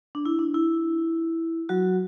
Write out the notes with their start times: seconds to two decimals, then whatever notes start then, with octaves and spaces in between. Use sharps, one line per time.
0.15 D4
0.26 E4
0.39 D4
0.54 E4
1.69 F#3 F#4